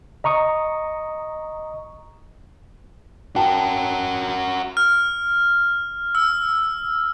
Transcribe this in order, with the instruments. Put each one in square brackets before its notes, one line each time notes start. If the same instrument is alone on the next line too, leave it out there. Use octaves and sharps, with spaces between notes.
[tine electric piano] D#5 A#5 C#6 D#6
[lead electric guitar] F#4 A#4 [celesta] G5 A5
[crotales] F6
E6